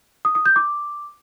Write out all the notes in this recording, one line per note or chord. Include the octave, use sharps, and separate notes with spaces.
D#6
D#6
G6
D6